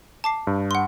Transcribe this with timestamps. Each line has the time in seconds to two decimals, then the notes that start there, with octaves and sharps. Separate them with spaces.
0.24 A5 D6 C7
0.47 G2
0.71 F#5 C6